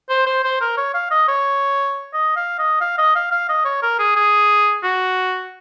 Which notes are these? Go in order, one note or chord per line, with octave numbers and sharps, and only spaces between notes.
C5
C5
C5
A#4
C#5
F5
D#5
C#5
D#5
F5
D#5
F5
D#5
F5
F5
D#5
C#5
A#4
G#4
G#4
F#4